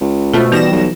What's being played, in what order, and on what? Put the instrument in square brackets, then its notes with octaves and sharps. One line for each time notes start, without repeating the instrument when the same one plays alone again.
[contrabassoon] C#2
[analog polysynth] B2 A3 [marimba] F4 F#4 C5
[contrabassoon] B2 [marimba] E3 D#4 [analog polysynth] G3 A#6 E7
[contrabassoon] B1